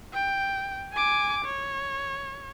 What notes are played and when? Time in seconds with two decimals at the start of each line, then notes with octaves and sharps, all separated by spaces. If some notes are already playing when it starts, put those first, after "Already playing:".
0.14 G5
0.93 G#5 D6
1.45 C#5